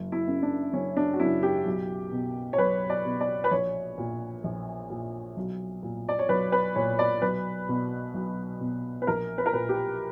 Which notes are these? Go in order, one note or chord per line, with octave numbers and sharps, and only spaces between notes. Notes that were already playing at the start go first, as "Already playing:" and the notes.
Already playing: F#1
E4
F#2 C#3
D4
F#1 C#4
D4
F#4
F#2 C#3 E4
G4
B1
B2
C#5
B1 B4
D5
B2
D5
B4
A#1 C#5
A#2
A#1
A#2
B1
A#2
D5
C#5
B1 B4
B4
A#2 C#5
D5
B1 B4
B2
B1
B2
B4
A#1 A#4
B4
A#4
A#2 B4
G4